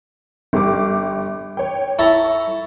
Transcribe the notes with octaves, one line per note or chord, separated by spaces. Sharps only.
G1 G4 D6
C#5 G5
E4 A4 A#5 C#6